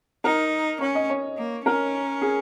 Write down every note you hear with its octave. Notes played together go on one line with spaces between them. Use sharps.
D#4 A#4
C#4 C#5
D#5
C#5
A#3
C#4 A#4
G#4